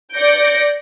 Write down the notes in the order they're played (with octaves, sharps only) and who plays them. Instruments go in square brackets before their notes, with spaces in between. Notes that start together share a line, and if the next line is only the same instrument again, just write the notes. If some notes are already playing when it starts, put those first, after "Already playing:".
[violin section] D5 G6 A#6 C#7 D7